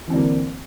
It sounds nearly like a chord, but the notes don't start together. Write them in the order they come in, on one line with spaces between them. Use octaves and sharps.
E3 C4 D3 A#3